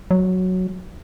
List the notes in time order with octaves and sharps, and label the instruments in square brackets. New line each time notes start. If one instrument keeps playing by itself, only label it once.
[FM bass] F#3